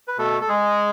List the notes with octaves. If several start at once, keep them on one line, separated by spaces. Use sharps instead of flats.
B4
B2 A3 A4
A4
G#3 G#4